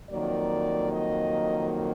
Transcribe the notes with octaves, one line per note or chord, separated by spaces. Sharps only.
F2 D#3 F#3 A#3 D5
D#5